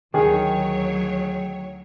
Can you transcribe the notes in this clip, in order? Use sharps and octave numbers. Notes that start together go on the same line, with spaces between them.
D2 D#3 F#3 G#4 C#5